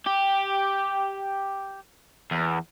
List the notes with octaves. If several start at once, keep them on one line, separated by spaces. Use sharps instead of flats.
G4
E2